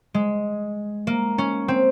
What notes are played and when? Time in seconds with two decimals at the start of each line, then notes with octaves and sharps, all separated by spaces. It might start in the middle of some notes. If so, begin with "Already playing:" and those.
0.14 G#3
1.07 A#3
1.38 C#4
1.68 C4